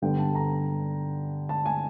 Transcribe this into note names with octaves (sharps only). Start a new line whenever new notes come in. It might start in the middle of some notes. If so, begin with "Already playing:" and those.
G2 D3 G3 B3 D4 G5
A5
A#5
A5
G#5